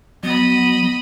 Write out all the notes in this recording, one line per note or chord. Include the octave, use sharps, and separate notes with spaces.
F#3 B3 D#5 B5